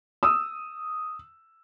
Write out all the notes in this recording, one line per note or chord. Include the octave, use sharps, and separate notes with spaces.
D#6 E6